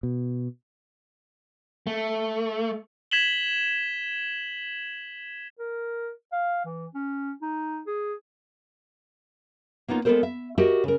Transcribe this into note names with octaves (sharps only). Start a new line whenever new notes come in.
B2
A3
G#6 B6 E7 F#7 G7
A#4
F5
E3
C#4
D#4
G#4
A#3 B3 D#4 F4 C#5
G#3 B3 D4 A4 A#4 C5
E5
F#4 G4 A#4 C#5 D#5 E5
C#3 A#4